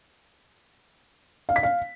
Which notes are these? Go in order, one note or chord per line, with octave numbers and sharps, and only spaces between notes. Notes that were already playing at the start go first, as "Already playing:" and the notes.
F5
B6
F5